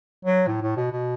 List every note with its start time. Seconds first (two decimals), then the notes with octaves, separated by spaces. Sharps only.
0.25 F#3
0.47 A2
0.62 A2
0.77 B2
0.92 B2